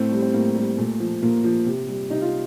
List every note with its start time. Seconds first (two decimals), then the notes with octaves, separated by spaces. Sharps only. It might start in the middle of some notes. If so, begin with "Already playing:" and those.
Already playing: A2 A3 C4
0.12 G3
0.22 C4
0.34 A2 A#3
0.56 G3
0.78 A#2 A3
1.00 F3
1.22 A#2 A#3
1.44 F3
1.66 C3
1.89 G3
2.10 C3 D#4
2.21 F4